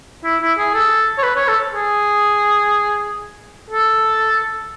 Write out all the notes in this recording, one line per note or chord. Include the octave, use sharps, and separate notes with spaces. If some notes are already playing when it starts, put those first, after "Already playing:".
E4
E4
G#4
A4
C#5
B4
C#5
A4
G#4
A4